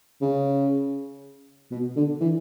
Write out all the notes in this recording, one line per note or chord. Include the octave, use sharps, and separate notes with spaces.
C#3
B2
D3
E3